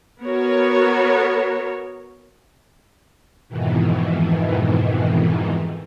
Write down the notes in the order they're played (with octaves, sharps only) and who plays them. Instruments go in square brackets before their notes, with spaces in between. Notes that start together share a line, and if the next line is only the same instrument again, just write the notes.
[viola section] B3 F#4 A#4 C#5
[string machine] F2 G#2 B2 D#3 E3